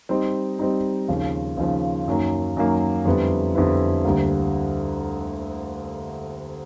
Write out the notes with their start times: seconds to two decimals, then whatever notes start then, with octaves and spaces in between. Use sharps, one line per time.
0.09 G3 C4 D#4
0.59 G3 C4 D#4
1.08 D#2 C#3 F3
1.57 D#2 C#3 F3
2.08 F#2 D#3 F#3 A#3
2.57 F#2 D#3 F#3 A#3
3.05 F2 D3 G3 B3 E4
3.55 F2 D3 G3 B3 E4
4.05 D2 D3 G3 A#3